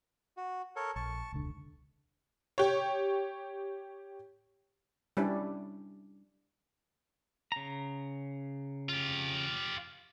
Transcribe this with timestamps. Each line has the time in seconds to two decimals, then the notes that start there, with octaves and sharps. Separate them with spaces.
0.37 F#4
0.76 A4 A#4 C#5
0.96 A#1 A5 C#6
1.32 E1 C#2 D3
2.58 G4 C#5
5.17 G3 C#4 D4 E4
7.52 C#3 A#5
8.89 F4 G4